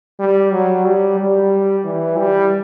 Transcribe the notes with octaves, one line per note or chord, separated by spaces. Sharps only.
G3
F#3
G3
G3
E3
G3